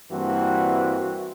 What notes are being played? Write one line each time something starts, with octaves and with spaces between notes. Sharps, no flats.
G2 E3 A#3 C4 F#4